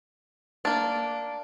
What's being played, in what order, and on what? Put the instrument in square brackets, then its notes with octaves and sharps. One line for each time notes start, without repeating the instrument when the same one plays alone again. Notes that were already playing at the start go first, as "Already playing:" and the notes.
[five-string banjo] A#3 D4